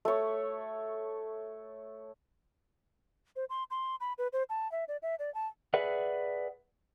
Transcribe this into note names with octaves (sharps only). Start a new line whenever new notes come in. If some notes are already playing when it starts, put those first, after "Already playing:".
A3 C#5
C5
C6
C6
B5
B4
C5
A5
E5
D5
E5
D5
A5
G#4 B4 D5 E5 F#5